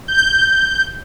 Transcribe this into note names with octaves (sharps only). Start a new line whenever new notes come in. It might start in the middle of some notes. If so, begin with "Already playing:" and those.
G6